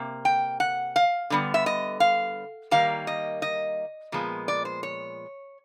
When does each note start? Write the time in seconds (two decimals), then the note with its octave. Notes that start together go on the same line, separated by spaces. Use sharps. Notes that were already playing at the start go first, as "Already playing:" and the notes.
Already playing: C3 A#3
0.25 G5
0.60 F#5
0.96 F5
1.30 D3 G3 B3
1.54 E5
1.66 D#5
2.00 F5
2.71 D#3 G3 A#3 F5
3.07 D#5
3.42 D#5
4.12 A#2 F3 G#3 B3
4.48 D5
4.65 C5
4.83 C#5